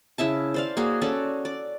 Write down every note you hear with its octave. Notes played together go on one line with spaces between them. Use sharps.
C#3 E4 E5 A5
C5 D5 F5
A#3 F#4 G#4
C#4 F#4 A4 D5
D5